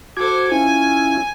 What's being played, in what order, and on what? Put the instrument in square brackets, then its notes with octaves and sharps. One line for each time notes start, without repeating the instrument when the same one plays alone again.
[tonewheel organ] F#4 D6 G#6 [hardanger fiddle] A4 C5
[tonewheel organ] C#4 E4 F4 [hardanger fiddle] G#5